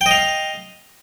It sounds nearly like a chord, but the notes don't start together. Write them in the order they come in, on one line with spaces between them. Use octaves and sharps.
G5 D#5 F5